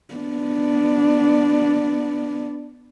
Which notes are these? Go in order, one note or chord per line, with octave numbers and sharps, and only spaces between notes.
B3 D4